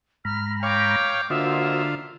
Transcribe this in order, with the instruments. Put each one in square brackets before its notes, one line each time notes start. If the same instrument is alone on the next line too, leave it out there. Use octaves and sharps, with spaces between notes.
[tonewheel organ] G#2 A#5 B5 [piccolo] F6
[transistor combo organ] C#5 F5 [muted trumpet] G5 [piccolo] D6
[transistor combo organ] D3 F4 [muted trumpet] A#3 [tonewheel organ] F#4 C5 D#5 [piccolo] E5